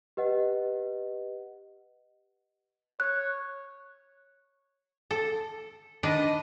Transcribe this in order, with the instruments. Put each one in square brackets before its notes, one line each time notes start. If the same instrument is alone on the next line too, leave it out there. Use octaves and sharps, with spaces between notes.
[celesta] G4 B4 D#5 F#5
[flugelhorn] C#5 [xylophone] F#6
[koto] A4
[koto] D#3 D4 B4 [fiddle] D#5